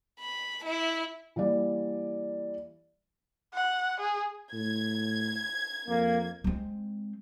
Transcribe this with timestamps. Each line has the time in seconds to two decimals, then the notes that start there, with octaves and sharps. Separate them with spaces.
0.19 B5
0.65 E4
1.36 E3 G3 A#3 D5
3.53 F#5
4.00 G#4
4.53 A2 G#6
5.88 F2 A#3
6.44 G#3 C4